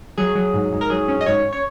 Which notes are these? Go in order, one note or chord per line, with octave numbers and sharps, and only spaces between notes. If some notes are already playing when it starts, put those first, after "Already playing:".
F#3 G#4
F#3
G#2
G#2
A#4
F#3 G#4
C#4
D#5
G#2 C#5
C#5